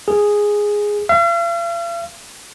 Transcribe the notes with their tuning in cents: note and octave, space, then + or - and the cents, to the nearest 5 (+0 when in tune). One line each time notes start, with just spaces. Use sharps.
G#4 -5
F5 -45